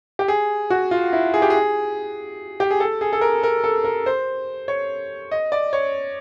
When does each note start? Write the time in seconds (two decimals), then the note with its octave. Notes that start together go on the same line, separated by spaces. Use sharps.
0.19 G4
0.28 G#4
0.70 F#4
0.91 F4
1.13 E4
1.34 G#4
1.42 G4
1.50 G#4
2.60 G4
2.71 G#4
2.80 A4
3.01 G#4
3.13 A4
3.21 A#4
3.43 A#4
3.64 A4
3.84 A#4
4.06 C5
4.68 C#5
5.32 D#5
5.52 D5
5.73 C#5